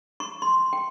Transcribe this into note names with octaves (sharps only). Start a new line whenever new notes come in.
C#6
C6
G5